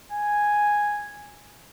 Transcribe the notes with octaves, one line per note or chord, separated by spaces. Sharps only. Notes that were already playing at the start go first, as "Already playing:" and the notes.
G#5